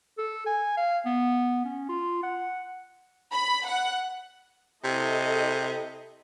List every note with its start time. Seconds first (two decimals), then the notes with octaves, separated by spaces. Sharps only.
0.18 A4
0.47 G#5
0.78 F5
1.06 B3
1.65 C#4
1.89 F4
2.24 F#5
3.32 B5
3.67 F#5
4.84 C3 E4 A4 D#5